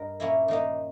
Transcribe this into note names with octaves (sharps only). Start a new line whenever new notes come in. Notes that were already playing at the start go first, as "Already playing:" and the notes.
Already playing: G2 D#4 A#4
A#2 A#3 C#4 E4
D#3 A#3 D#4